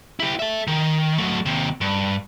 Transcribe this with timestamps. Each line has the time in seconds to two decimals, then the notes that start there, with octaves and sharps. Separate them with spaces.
0.20 E4 G4
0.39 A4 E5
0.67 D#3
1.18 F#3 A3
1.46 D#2 C3
1.81 G2